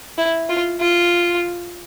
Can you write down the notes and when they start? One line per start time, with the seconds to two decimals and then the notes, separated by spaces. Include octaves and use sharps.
0.18 E4
0.49 F4
0.81 F4